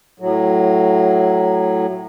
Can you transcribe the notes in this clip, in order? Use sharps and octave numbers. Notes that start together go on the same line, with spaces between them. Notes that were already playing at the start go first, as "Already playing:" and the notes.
A2 F#3